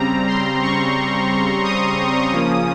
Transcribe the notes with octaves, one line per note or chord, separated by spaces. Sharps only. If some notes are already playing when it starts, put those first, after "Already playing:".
Already playing: C#3 G3 C4 A#5
C6
C#6
D#6
C#3 F3 A#3 C#4